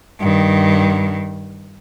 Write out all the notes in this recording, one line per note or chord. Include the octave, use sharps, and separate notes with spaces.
G2 D#3